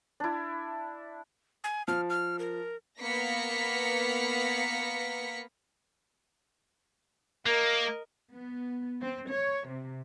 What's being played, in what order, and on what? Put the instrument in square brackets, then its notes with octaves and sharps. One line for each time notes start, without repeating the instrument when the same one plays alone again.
[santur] D4 E4
[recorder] G#5
[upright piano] F3 [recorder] F6
[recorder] F6
A#4
[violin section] A#3 B3 F5 A#6 B6 C#7
[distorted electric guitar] A#3 [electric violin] A#4 D#5
[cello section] B3
C4
C#5
C3